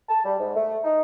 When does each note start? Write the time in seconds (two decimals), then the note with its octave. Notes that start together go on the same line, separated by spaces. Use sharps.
0.09 A5
0.24 G3
0.39 G#2
0.56 A3
0.84 D#4